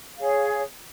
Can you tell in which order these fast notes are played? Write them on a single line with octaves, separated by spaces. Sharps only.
F5 G#4 C#5